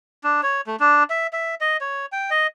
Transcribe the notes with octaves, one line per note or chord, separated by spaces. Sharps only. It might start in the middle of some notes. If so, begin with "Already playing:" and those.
D4
C#5
A3
D4
E5
E5
D#5
C#5
G5
D#5